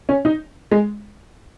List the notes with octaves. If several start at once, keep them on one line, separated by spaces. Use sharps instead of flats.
C#4
D#4
G#3